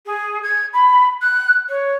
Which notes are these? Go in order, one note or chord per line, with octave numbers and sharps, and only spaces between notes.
G#4
G#6
B5
F#6
C#5